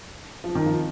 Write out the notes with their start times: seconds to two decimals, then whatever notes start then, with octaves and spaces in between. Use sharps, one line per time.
0.44 F3
0.55 D#3
0.66 F3